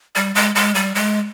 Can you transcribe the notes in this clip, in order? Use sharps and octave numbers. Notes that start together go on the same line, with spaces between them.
G3
G#3
G#3
G3
G#3